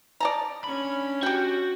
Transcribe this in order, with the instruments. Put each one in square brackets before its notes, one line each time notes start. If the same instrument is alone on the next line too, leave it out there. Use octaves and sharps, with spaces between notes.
[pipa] D5 A5 A#5
[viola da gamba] C#4 D4 [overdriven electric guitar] B5
[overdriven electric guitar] F#4 [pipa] G4 G5